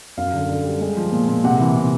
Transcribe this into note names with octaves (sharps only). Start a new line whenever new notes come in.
F#2 F5
D3
D3
G3
G#3
F3
A#2
A#2
C3 F#5
E3
C3